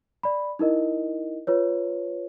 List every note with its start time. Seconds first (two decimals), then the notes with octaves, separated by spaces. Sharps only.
0.23 D5 B5
0.59 D#4 E4 A#4 D#5
1.47 F4 B4 C#5